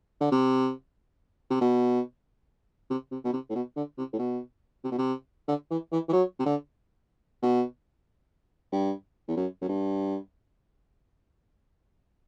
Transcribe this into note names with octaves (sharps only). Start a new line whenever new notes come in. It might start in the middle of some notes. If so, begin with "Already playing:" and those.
D3
C3
C3
B2
C3
C3
B2
C3
A2
B2
D3
C3
A2
B2
C3
B2
C3
D3
E3
E3
E3
F#3
C3
D3
B2
G2
E2
F#2
F#2
G2